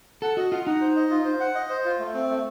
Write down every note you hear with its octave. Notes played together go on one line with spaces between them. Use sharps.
A4 F#5
F#4 D#5
F4 F#5
D#4 F#5
C5
D#5
F4
C5
F#5
D#5
C5
F4
A3
C4
A3